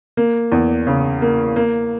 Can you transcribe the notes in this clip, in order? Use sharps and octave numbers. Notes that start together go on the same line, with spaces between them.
A#3
E2
C#3
A#3
A#3